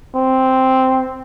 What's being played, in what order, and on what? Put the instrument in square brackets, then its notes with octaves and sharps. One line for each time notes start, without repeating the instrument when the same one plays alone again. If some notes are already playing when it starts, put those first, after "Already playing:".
[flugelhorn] C4